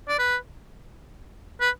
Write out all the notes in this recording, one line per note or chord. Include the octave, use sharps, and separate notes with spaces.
D5
B4
B4